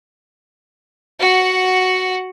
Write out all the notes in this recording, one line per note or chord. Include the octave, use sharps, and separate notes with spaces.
F#4 F#5